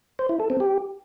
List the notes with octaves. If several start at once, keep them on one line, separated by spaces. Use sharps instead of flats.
C5
E4
A4
C4
G4